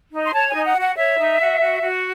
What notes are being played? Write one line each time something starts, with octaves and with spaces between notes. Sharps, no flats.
D#4
C6
C#5 A5
G#5
D#4
F#5
F#4 F#5
C#5 E5
D#4
F#4
F#4
F#4